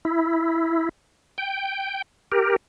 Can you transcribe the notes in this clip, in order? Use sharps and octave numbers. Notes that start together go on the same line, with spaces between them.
E4
G5
G4 A#4